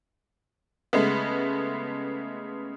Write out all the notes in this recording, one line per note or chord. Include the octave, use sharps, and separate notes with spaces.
C#3 G#3 A3 B3